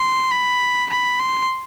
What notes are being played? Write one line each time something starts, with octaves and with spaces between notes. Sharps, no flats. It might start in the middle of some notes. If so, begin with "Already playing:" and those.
Already playing: C6
B5
B5
C6